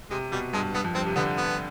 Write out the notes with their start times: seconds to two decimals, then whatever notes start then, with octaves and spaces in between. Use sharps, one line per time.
0.10 C3 G#3
0.32 B2 G3
0.53 G2 G#3
0.74 G2 B3
0.84 F2
0.95 G2 C4
1.06 C3
1.16 D3 B3
1.37 B3